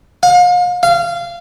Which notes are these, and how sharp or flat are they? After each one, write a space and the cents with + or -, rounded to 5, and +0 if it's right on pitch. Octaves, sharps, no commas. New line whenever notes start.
F5 +40
F5 -20